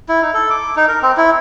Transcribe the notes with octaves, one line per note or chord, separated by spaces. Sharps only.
E4
D#4
A4
D6
D#4
A#4
C4
E4